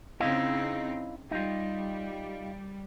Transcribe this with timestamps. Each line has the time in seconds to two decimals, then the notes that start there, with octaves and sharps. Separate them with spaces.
0.20 C#3 C4 D#4 E4 D#5 F5
1.31 G3 D#4 F4